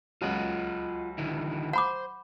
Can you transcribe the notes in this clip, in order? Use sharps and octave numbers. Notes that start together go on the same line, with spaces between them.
C#2 F#3 F4 D#5 F#5
D3 D#3 E4
C5 F#5 B5 D6